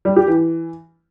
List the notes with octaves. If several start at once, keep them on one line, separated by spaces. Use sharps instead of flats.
G3
G4
E3